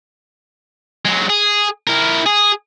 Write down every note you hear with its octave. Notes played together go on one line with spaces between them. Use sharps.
F#3 G#3
G#4
E4 A#4
G#4